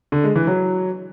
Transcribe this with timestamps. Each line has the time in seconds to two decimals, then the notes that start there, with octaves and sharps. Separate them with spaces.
0.12 D3
0.24 G#3
0.35 E3
0.47 F#3